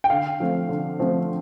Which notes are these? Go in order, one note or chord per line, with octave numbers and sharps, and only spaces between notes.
G5
D3 F5
F3 A3 C4
D3
F3 A3 C4